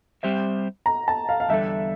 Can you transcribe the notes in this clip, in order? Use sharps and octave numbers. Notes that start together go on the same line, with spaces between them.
G3 C4 G4 C5 E5
A#5
A5
F5
F5
E2 D3 G3 D4 A4 E5